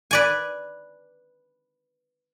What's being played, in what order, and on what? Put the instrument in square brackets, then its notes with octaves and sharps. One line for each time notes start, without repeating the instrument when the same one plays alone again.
[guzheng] B4 D5 G#5